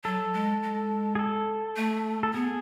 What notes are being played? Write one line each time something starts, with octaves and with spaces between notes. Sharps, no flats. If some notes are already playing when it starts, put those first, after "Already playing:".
F#3 A4
G#3
G#3
G#4
A4
A3
A4
B3 G#4